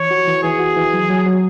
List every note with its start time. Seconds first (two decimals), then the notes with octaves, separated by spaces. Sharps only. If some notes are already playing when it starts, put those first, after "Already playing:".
Already playing: E3 C#5
0.11 F#4
0.27 E3
0.43 E3 G#4
0.59 F#4
0.77 E3
0.93 F#3
1.10 F#3
1.26 F#3